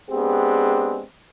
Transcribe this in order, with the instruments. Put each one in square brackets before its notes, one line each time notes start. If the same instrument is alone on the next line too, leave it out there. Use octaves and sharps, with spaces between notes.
[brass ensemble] G#3 B3 C4 D4 G4 G#4